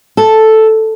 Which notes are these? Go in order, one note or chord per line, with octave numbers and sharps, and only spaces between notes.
A4